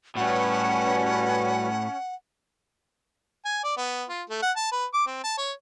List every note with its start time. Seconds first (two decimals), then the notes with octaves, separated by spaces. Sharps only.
0.17 A2 G3 C#4 F#4 B4 F#5
3.45 G#5
3.64 D5
3.77 B3
4.09 F4
4.30 A3
4.42 F#5
4.56 A5
4.72 B4
4.94 D6
5.07 C4
5.24 A5
5.38 C#5